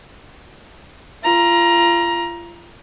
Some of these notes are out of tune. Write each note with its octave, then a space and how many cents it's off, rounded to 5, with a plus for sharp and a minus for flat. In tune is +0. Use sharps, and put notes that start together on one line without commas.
F4 -30 A#5 +20